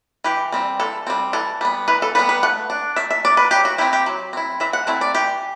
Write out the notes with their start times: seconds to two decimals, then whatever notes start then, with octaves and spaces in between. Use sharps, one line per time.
0.24 E3 G4
0.52 G3 C4
0.80 E3 A4
1.07 G3 C4
1.33 E3 A4
1.61 G3 B3
1.88 E3 B4
2.02 A4
2.15 G3 B3 B4
2.29 B4
2.43 A3 F#5
2.70 D4
2.96 A3 E5
3.11 E5
3.25 D4 D5
3.37 B4
3.51 F#3 G4
3.65 F#4
3.78 C4 E4 G4
3.93 G4
4.06 F#3
4.33 C4 E4
4.60 E3 E5
4.73 F#5
4.87 A3 C4 E4 E5
5.01 D5
5.15 E3 G4